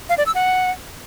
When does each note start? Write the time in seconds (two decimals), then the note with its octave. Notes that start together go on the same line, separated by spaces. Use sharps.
0.09 F5
0.18 D5
0.26 E6
0.35 F#5